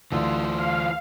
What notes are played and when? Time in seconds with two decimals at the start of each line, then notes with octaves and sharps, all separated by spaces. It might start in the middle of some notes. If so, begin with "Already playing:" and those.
0.12 D2 E3 F4
0.58 F5